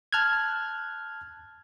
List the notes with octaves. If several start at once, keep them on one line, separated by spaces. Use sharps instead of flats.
A5 F6 F#6 G#6